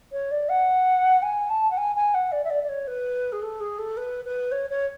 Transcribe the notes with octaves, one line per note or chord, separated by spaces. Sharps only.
C#5
D5
F#5
G#5
A5
F#5
G#5
G#5
F#5
D5
E5
D5
D5
C#5
B4
G#4
A4
G#4
A4
B4
B4
C#5
C#5